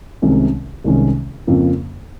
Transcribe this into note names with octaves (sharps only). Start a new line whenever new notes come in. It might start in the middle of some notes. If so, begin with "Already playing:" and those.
C2 C3 D#3 G#3 C#4
C2 C3 D#3 G#3 C#4
F2 C#3 F3 A#3